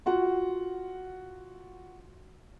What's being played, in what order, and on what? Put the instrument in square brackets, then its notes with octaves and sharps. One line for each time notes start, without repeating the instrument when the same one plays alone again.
[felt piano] F4 F#4 F#5